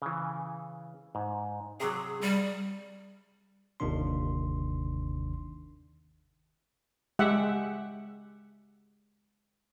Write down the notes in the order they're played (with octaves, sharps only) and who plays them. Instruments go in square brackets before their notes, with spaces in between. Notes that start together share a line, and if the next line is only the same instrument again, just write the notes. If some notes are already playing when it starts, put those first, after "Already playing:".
[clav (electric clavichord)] C#3 E3
G#2
[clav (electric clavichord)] C3 F#3 [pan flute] G#4
[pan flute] G3
[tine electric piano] G1 D#2 C3 D#3 D4 C6
[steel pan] G#3 G4 E5 F#5